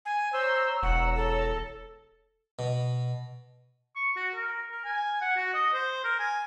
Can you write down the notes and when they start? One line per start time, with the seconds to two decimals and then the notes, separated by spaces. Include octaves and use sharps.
0.05 G#5
0.33 C5 C#5 A#5 E6
0.83 E1 F#5
1.16 A4
2.59 B2
3.96 C#6
4.17 F#4
4.36 A#4
4.71 A#4
4.85 G#5
5.21 F#5
5.37 F#4
5.54 D#5
5.73 C5
6.04 A#4
6.20 G#5